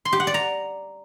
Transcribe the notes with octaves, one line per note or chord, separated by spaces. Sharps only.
C6
G4
F#5
D5
A#5